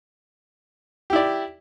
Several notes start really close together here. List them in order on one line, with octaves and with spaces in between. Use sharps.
G4 E4 D5